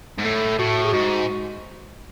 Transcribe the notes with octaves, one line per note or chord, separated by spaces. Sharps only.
G#2
A2 A4
A2 F#4
G#4
G#2 F#4